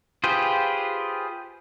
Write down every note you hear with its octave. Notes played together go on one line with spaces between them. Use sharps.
F4 G4 G#4 B4 C5